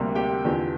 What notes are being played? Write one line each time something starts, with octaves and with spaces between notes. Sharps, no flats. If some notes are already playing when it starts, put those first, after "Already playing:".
Already playing: D2 C3 G3 A#3
G4 G5
E2 D3 F3